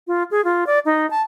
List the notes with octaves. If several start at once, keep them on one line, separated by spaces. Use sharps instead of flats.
F4
G#4
F4
D5
D#4
A5